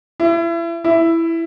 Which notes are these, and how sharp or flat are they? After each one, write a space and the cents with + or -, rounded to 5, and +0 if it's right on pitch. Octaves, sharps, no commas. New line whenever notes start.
E4 +30
E4 +5